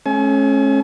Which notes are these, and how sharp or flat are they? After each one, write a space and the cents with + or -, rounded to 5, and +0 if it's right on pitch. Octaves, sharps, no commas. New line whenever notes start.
A3 -45 C#4 -25 G#5 +40